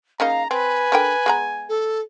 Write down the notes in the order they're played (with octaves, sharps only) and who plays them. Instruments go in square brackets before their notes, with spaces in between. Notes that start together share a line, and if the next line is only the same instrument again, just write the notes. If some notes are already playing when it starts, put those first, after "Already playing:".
[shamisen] C#3 A#3 D#4 [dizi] F5 [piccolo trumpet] A#5
[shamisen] C4 [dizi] B4 [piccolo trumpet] G#5
[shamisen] D3 A#4 G5
G#3 B3 A#5
[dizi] A4